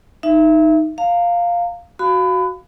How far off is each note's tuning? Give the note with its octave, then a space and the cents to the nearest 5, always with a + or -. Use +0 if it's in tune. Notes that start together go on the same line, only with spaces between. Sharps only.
D#4 +0 E5 +20
F5 +0 A#5 -30
F#4 +0 F5 +0 B5 +30